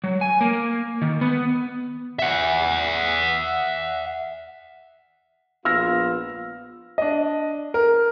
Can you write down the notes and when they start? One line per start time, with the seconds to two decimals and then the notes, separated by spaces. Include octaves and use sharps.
0.04 F#3
0.21 G#5
0.41 A#3
1.02 D#3
1.21 B3
2.19 E5 F#5
5.65 A#1 B3 F4 E6 F6 A#6
6.98 D4 D#5
7.74 A#4